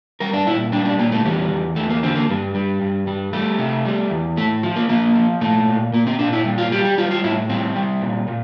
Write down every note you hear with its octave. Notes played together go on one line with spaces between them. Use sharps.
G3 A#4
D4
A#2 E4
G3 D4
D4
A#2 A#3
A3
E2 G3
E2
E2 A3
A#3
D3 C4
A#3
G2 G3
G3
G2
G3
G3 A3
C3
G3
E2
A2 A3
F3
A#3
F3 A#3
F3
A#2 A3
A#2
A#2 A#3
C4
A#2 D4
E4
G3
F4
G3 G4
G4
G3 F4
F4
A2 E4
G3 C4
G3
A#2
A#2